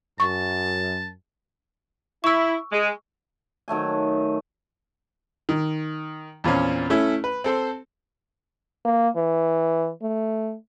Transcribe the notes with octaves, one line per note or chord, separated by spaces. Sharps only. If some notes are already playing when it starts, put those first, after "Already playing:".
F#2 A5 C#6
E4 C#6 E6
G#3
D#3 F#3 A3 G#5
D#3
E2 A#2 C4 C#4
A3 C#4 E4
B4
C4 A4 C5
A#3
E3
A3